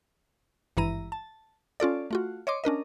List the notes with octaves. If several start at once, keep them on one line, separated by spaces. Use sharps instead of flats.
G#1 G2 E3 E4 A#5 D#7
A5
C#4 F4 A4 D5
A3 F4 F#4
C#5 D#5 C6 D6
C#4 D4 A#4 D#5